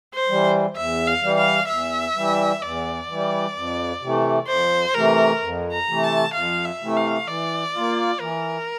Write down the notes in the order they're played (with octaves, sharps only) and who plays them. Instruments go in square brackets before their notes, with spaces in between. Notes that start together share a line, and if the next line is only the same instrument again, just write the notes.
[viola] C5
[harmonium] E3 G3
[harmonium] E2 [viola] E5
[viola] F5
[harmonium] E3 G3
[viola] F5
[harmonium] E2 [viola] E5
[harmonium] E3 G3
[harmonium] E2 [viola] D5
[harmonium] E3 G3
F2
C3 E3 A3
[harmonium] F2 [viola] C5
[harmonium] C3 E3 A3 [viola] A#4
[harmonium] F2
[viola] A#5
[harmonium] C3 E3 A3
[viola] A5
[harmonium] F2 [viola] F5
[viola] E5
[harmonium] C3 E3 A3
[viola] F5
[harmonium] E3 [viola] D5
[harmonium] A#3 F4
[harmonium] E3 [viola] A#4